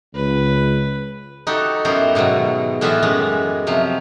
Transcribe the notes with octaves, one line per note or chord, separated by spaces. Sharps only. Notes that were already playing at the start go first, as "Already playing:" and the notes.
C#2 B4
D#4 F#4 G4 A4
F#2 B3 E4 G4 C5 A#5
G#2 B2 D#3 F#3
A2 E3 B3 F4 D#5 E5
F#2 G#3 B3 G4
C3 F3 F#3